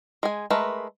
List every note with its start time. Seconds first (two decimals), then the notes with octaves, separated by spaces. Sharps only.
0.23 G#3 G#5
0.50 G#3 A3 A#4 B4